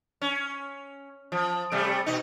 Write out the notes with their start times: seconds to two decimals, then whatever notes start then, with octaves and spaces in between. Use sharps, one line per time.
0.22 C#4
1.32 F3
1.72 C3 G3 A3
2.06 B2 D#4